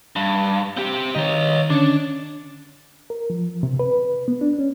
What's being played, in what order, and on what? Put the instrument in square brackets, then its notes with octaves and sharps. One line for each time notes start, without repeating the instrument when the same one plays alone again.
[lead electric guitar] G2
C4 G4
[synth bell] D#3 F7 [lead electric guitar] C#5 D#5
[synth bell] D3 C#4 C#5 [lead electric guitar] D4
[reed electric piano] A#4
F3
C3
B4
B3
D4
C#4